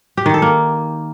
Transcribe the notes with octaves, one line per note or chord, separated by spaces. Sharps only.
G4
D#3
A4
A#3